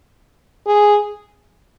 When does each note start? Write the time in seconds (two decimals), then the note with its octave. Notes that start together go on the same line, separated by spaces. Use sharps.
0.67 G#4